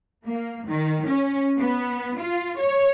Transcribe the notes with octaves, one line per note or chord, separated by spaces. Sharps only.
A#3
D#3
C#4
B3
F4
C#5